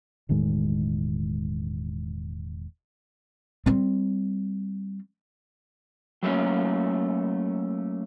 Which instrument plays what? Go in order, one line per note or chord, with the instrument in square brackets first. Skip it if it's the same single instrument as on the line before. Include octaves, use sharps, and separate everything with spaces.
[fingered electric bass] E1 A2 D#3 G#3
[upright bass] G3 C4
[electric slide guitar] F#3 A3 A#3 C#4